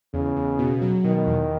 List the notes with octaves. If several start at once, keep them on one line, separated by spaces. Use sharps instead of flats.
E2 C#3
E2
B2
F#3
B2 D#3
E2